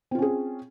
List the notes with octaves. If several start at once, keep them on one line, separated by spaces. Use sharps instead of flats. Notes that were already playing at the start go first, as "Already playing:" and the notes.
C4 C#4 F4 G#4